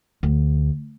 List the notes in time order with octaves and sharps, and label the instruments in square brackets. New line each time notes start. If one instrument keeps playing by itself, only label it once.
[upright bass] D2